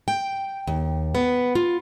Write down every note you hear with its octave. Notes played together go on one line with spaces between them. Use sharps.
G5
D#2
B3
F4